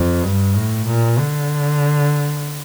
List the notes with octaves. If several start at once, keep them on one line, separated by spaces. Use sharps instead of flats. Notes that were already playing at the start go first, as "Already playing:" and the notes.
Already playing: F2
G2
A2
A#2
D3